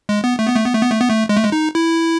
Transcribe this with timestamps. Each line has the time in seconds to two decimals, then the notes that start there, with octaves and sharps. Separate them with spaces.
0.09 G#3
0.24 B3
0.39 A3
0.48 B3
0.56 A3
0.65 B3
0.73 A3
0.82 B3
0.91 A3
1.00 B3
1.09 A3
1.29 G#3
1.37 A3
1.44 G#3
1.52 D#4
1.75 E4